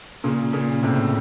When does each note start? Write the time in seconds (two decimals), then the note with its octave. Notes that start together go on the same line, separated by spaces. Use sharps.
0.24 A#2 C#3
0.53 A#2 C#3
0.83 A2 C3